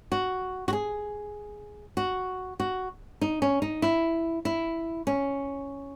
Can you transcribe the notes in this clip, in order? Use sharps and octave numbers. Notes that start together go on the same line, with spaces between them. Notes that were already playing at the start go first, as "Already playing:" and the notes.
F#4
F#4
G#4
F#4
F#4
D#4
C#4
D#4
E4
E4
C#4